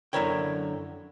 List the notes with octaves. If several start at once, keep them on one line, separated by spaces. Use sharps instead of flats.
F#2 D3 E4 A#4 C#5 G5